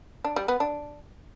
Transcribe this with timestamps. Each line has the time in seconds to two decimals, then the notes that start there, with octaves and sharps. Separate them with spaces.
0.24 D4
0.36 G3
0.48 B3
0.60 D4